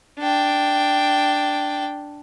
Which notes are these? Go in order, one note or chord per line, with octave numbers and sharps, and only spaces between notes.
D4 G5